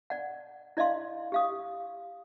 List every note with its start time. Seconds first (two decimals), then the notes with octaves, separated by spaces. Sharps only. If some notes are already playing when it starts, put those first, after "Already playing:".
0.10 D5 F#5
0.77 E4 D5 D#5 F5 C6
1.32 G4 F5 D#6